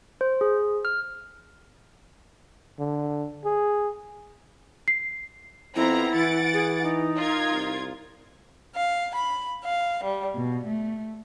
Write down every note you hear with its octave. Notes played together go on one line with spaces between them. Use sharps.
C5
G#4
F6
D3
G#4
C7
F2 B3 C4 E4 A#5
E3 F#5 A6 D7
G#4
D#4
F4 A#4 G#6
C2
F5
B5
F5
G3
B2
A3